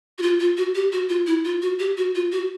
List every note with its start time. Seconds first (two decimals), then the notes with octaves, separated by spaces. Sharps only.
0.18 F#4
0.22 F4
0.40 F4
0.57 F#4
0.75 G4
0.92 F#4
1.09 F4
1.27 E4
1.45 F4
1.62 F#4
1.79 G4
1.97 F#4
2.15 F4
2.32 F#4